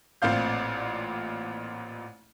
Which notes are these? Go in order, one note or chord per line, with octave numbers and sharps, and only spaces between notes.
A1 A#2 C4 D5 F5 G6